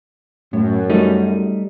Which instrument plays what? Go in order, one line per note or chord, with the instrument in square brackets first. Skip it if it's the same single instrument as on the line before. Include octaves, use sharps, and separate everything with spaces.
[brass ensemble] F#2 [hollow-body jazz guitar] A2
[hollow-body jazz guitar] G3 A3 D#4